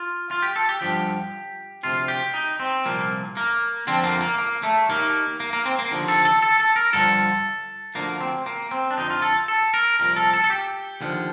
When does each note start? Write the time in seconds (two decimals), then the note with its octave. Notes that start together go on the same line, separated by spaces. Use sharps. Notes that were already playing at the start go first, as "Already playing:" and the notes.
Already playing: F4
0.31 F4
0.42 G4
0.56 A4
0.69 G4
0.81 G2 D3 F3 G4
1.83 D2 C3 F3 F4
2.08 G4
2.34 D#4
2.60 C4
2.85 C2 A#2 F3 A#3
3.37 A#3
3.87 F2 D3 F3 C4
4.04 A#3
4.21 A#3
4.38 A#3
4.63 A3
4.89 D#2 D#3 A#3
5.40 A#3
5.53 A#3
5.66 C4
5.79 A#3
5.91 D#2 D3 F3
6.08 A4
6.25 A4
6.42 A4
6.60 A4
6.76 A#4
6.93 G2 D3 F3 A4
7.95 D2 D3 F3 A#3
8.21 C4
8.46 A#3
8.71 C4
8.91 D4
8.97 F2 D3 F3 D#4
9.10 F4
9.22 A4
9.48 A4
9.74 A#4
10.00 C2 A#2 F3 A#4
10.16 A4
10.34 A4
10.44 A4
10.50 G4
11.01 D#2 D3 F3